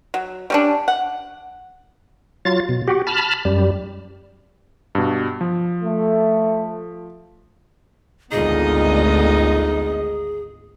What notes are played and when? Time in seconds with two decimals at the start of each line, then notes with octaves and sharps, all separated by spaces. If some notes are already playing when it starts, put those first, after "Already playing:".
0.14 F#3
0.50 G3 C#4 D4
0.88 F#5
2.45 F#3 F4 A6
2.69 B2
2.88 F#4 G4
3.07 A5 B5 F6
3.45 F#2 G3
4.95 G2 B2
5.41 F3
5.84 A3
8.32 G#1 D2 B3 D#4 F4 G#4 D#5